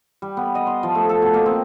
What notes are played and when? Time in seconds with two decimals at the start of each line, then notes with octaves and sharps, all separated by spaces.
0.22 G3
0.37 B3
0.55 D#5
0.67 C6
0.83 F3
0.95 A3
1.09 A4
1.22 B2
1.34 A#3
1.46 C4